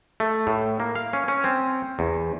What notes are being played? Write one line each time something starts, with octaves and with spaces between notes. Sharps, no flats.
A3
A2
A#3
F5
C#4
C#4
C4
E2